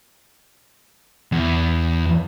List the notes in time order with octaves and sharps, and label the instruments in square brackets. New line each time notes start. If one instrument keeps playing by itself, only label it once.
[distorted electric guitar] E2